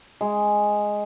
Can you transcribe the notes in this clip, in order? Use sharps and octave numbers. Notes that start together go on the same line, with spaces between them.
G#3